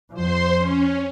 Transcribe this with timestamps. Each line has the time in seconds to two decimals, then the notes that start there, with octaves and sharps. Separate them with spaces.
0.14 F2 F3 C5 C6
0.58 C#4